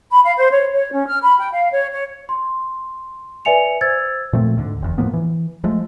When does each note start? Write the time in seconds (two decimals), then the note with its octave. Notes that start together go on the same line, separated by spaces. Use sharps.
0.11 B5
0.24 F5
0.38 C5
0.51 C#5
0.74 C#5
0.91 C#4
1.07 F6
1.22 B5
1.39 G5
1.53 F5
1.72 C#5
1.92 C#5
2.29 C6
3.45 B4 D5 E5 G#5 C#7 F7
3.81 C5 E6 G#6 A6
4.33 A#2 F3 A3 C4
4.57 D2 G#2 D3
4.82 F1 E2
4.98 A2 F3 A#3 B3
5.13 E3
5.64 F3 G#3 A3